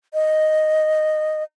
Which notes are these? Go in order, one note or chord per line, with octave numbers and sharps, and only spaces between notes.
D#5